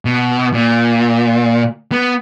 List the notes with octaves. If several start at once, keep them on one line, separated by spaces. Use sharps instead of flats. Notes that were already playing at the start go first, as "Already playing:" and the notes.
B2
A#2
B3